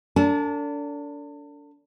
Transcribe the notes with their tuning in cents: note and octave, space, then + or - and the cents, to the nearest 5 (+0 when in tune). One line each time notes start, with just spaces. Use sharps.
D4 -30 A4 +40 A5 -35